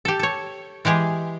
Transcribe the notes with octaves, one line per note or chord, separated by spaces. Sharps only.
G4 A4
A4 C#5
E3 G#3 G4 G#4